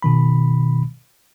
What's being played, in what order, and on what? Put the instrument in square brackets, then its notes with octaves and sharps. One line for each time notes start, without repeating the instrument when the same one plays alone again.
[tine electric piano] B2 D#3 B5